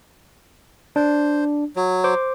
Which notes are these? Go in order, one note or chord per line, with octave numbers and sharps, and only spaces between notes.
D4 C5
F#3
C5 D6